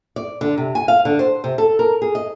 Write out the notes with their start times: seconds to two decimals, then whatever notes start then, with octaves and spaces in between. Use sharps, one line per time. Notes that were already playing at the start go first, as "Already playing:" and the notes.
0.16 D5
0.41 D3
0.58 C3
0.75 G#5
0.88 F5
1.05 D3
1.19 C5
1.44 C3
1.58 A4
1.79 A#4
2.02 G#4
2.15 D#5